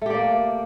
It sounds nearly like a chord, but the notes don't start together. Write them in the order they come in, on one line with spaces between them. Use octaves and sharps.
A3 G4 D5 A#3